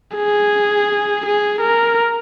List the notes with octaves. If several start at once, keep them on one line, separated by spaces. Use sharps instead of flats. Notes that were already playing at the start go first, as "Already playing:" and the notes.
G#4
G#4
A#4